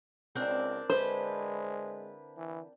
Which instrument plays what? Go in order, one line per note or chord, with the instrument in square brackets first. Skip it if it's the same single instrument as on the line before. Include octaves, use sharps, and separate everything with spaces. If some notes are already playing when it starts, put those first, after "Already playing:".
[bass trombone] C#2 [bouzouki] C4 D4 A#4
[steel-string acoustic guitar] D3 E4 B4 [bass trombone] G#3 [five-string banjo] C5
[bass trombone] E3